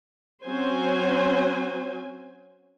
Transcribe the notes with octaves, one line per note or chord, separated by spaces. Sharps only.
F#3 C4 C#4 C5 G#5